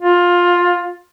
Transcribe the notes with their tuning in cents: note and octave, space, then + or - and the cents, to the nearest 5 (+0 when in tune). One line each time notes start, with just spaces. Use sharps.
F4 +15